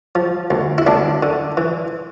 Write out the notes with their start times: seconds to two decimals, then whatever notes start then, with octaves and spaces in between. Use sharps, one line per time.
0.15 F3
0.51 D2
0.78 E4
0.87 D2 D4
1.23 D3
1.57 E3